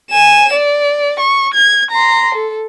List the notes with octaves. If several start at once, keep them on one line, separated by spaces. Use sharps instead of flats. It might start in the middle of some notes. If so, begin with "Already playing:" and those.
G#5 E7
D5
C#6
G#6
A#5 C6
A4